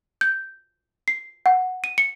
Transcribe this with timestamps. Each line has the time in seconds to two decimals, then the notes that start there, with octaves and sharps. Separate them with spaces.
0.21 G6
1.08 C7
1.46 F#5
1.84 D#7
1.98 C#7